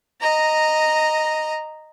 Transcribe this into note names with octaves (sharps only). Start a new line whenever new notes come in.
D#5 A#5